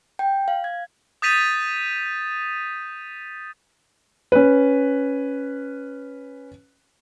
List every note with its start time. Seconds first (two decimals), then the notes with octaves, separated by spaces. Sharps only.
0.19 G5
0.48 F5
0.64 G#6
1.22 D#6 G6 A6 B6 D#7 F7
4.32 C#4 B4